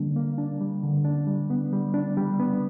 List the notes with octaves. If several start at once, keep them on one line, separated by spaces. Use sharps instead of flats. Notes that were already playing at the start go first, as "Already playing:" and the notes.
Already playing: D3 G3 A#3 D4
A#3
D4
G3
D3
D4
G3
B3
G3
D4
G3
B3